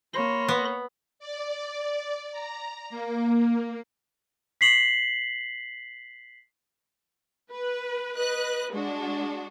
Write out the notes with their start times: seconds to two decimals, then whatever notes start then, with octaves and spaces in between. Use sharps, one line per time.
0.14 A#3 C#5 B5 C6 A#6
0.49 B3
1.19 D5
2.32 A#5
2.90 A#3
4.61 B6 C7 F#7
7.51 B4
8.16 B4 D#5 F#6
8.73 G#3 D4 F#4